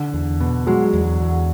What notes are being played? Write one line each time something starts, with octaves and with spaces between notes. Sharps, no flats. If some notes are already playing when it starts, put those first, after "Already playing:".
Already playing: D3
E2
B2
F#3 G#3
E2
E2